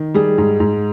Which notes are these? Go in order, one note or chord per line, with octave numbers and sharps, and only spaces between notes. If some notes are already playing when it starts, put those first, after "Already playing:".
Already playing: D#3
G3 G#4
G#2
G#2